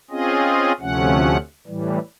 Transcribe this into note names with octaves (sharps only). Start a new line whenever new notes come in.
C4 C#4 F4 G#4 D#5
D2 C3 F3 A3 C#4 F#5
A2 E3 G3